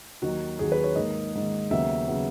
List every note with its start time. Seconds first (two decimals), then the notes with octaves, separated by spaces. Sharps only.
0.22 D#2 D#3 F#3 F#4
0.59 D#2 D#3 F#3 G#4
0.72 B4
0.84 C#5
0.96 G#2 D#3 A#3 D#5
1.33 G#2 D#3 A#3
1.71 D#2 C#3 F#3 B3 E5
2.08 C#3 F#3 B3